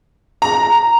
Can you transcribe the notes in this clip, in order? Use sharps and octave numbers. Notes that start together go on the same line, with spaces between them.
A#5